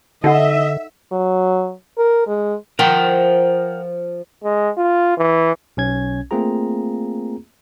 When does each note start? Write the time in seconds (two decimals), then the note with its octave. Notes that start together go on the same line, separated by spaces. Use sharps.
0.24 D3 D#4 A4 D#5 E5 F#5
1.12 F#3
1.98 A#4
2.27 G#3
2.79 F3 A#4 F#5 G5
4.44 G#3
4.78 F4
5.17 E3
5.77 B1 C#4 G#6
6.31 A3 A#3 C4 F4 G#4 A#5